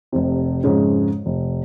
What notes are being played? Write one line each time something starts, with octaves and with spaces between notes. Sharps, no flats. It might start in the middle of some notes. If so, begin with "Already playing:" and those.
F1 C3
F2 G#2 C#3 G#3 C#4
F1